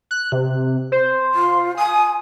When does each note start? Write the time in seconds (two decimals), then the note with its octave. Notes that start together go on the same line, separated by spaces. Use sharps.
0.11 F#6
0.32 C3
0.92 C5
1.34 F4
1.77 G#5 D#6